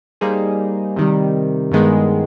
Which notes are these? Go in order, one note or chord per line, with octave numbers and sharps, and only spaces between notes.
G3 A#3 D#4 G#4 C5
C3 D#3 G3
G2 D#3 G#3 B3